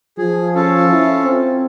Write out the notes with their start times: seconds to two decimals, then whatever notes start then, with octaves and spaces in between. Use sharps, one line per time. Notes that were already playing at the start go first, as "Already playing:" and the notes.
0.18 F3 G#4
0.55 C#4 F4 A4
0.91 E4
1.23 C4